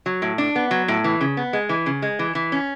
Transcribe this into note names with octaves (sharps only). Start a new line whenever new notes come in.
F#3
A2
D4
B3
F#3
A2
E3
C#3
B3
G#3
E3
C#3
G#3
E3
E3
C#4